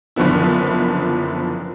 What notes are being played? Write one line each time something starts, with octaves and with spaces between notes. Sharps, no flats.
F#1 D3 F3 B3 E4